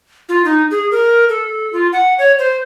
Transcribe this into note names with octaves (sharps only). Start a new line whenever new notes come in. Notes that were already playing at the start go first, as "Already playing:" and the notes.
F4
D#4
G#4
A#4
A4
F4
F#5
C#5
C5